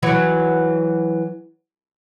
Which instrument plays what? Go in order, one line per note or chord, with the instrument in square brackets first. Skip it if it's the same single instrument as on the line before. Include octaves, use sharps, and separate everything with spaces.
[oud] E3 F#3 F#4